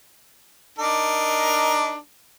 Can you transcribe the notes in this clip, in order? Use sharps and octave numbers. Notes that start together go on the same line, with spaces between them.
D4 D#4 A#4